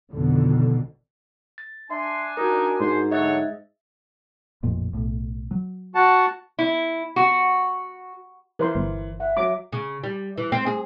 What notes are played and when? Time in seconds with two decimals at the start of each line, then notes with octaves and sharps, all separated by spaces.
0.12 G#1 F2 B2 D3
1.58 A6
1.90 D4 E5 G#5 C6
2.37 D#4 F#4 A#4
2.80 G#2 C5
3.11 D3 F#3 C#5 D#5 E5 F#5 A6
4.63 A1 F2 A#2
4.93 B1 A2
5.51 F#3
5.95 F#4 F#5 A5
6.59 E4
7.16 F#4
8.59 E3 A#4 C5 C6
8.75 G1
9.20 E5 F#5
9.37 F#3 D6
9.72 C#3
10.03 G3
10.38 E3
10.52 C4
10.66 G#4